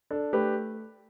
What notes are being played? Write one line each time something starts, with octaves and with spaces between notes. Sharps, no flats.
D4 A4
A3 G4 B4